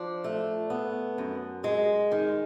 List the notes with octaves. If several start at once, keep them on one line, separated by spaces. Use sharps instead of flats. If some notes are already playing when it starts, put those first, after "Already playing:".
Already playing: F3 D4
A3
B3
F#2
G#3
D#3